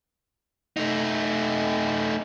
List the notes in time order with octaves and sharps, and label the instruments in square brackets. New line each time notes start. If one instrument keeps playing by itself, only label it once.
[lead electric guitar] A3 D#4